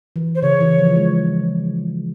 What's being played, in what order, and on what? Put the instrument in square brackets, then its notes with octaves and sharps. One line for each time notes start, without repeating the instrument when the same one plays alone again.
[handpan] E3
[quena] C5
[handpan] C#3 [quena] C#5
[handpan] E3
F3
G#3